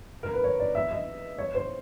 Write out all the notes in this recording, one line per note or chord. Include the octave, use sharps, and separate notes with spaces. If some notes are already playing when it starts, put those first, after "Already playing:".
A#4
B4
C#5
D5
E5
D#5
C#5
C5